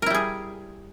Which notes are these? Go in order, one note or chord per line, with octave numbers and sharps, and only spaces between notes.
G3 E4 G#4 A#4